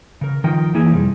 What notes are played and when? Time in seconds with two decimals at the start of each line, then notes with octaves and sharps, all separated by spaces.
0.21 C#3 A#4
0.44 D#3 F3 A#4 D#5 G5
0.74 E3 A#3 E4 G#4
0.92 F2 C3 G3